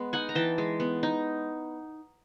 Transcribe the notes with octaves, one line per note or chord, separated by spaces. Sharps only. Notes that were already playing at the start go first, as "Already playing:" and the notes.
Already playing: G#3 B3
D#4 F#5 G#5
A#5
E3 G5 A5
G#3
B3
D#4